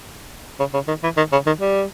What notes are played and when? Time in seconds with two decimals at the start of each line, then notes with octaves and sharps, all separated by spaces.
0.59 C#3
0.74 C#3
0.88 D#3
1.03 E3
1.17 D#3
1.32 C#3
1.46 D#3
1.61 G3